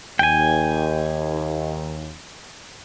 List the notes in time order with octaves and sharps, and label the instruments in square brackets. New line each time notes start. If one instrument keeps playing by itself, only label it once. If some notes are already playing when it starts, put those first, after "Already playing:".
[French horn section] D#2 [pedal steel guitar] G5 G#5